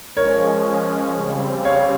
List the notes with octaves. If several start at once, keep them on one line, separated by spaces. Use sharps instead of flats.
F3 G#3 C#4 A#4 C#5
C#3 G3 C4
C#5 F5